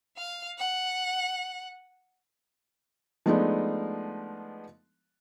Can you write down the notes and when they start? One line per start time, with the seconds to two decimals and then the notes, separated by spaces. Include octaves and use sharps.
0.17 F5
0.58 F#5
3.26 F3 G#3 A3 B3 D4 D#4